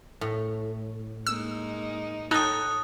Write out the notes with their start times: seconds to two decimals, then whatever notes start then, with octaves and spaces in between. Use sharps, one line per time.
0.21 A2
1.27 G#3 A#3 D#4 E6
2.31 D#4 A4 C#5 G5 D#6 F#6